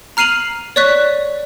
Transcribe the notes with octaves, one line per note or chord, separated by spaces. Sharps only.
A#5 F6 C7 D#7 F7 F#7
C#5 D5 C#6 F#6 B6